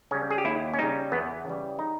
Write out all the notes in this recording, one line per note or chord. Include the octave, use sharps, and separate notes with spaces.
C#3 G3 C#4
G#4
G4
D#2 E4
C#4
C#3 G3 D#4
E2 B3
C#3 E3 G3
D#4